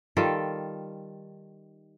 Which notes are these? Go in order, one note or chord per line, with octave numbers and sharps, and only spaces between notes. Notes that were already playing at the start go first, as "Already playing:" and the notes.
D#3 G3 F4 A4